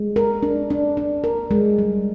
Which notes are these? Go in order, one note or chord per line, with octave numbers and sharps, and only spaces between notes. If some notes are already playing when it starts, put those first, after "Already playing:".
Already playing: G#3
A#4
D4
D4
D4
A#4
G#3
G3